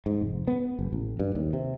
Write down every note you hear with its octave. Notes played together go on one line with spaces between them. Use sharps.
G#2
F1
B3
F#1
A1
G2
D#2
C3